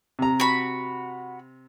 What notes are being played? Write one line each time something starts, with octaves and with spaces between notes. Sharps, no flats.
C3 A#5
F#4 B5